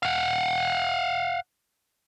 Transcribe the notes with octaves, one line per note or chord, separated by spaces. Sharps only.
F5 F#5